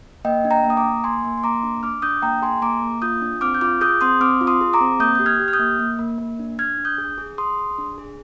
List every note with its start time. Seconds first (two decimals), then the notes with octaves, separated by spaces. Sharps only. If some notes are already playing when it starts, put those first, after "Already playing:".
0.25 A#3 D#5 G5
0.45 D4
0.51 G5 A#5
0.64 A#3
0.70 D#6
0.77 A#5 D6
0.83 A#3
1.04 A#3 G#5 C6
1.24 A#3
1.38 C6
1.43 A#3 A#5 D6
1.63 D4
1.83 D4 D6 F6
2.02 D4 D#6 G6
2.22 A#3 G5 A#5
2.42 G#4 G#5 C6
2.62 A#3 A#5 D6
2.82 A#3
3.02 F4 D#6 G6
3.21 D4
3.41 C4 D6 F6
3.54 G6
3.61 F4 D6 F6
3.81 G#4 D#6 G6
4.01 C4 C6 D#6
4.21 C4 D6 F6
4.41 F4
4.47 C6 D#6
4.61 G#4
4.73 A#5 D6
4.81 C4
5.00 A#3 D#6 G6
5.15 G4 G6
5.26 F6 G#6
5.40 G4
5.48 F6
5.53 D#6 G6
5.59 A#3
5.79 A#3
5.99 A#3
6.18 A#3
6.39 D4
6.58 D4 F6 G#6
6.78 D4
6.85 D#6 G6
6.98 G#4
7.18 G#4
7.38 G#4 C6 D#6
7.58 G#4
7.78 D4
7.98 G#4